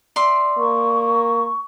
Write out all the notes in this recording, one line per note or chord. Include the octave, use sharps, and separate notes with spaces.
D5 E5 C6
A#3 C#6